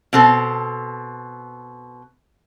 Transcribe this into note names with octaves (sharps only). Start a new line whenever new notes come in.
B2 C4 A4